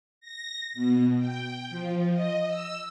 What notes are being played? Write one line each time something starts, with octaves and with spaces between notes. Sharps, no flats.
A#6
B2
G5
F3
D#5
E6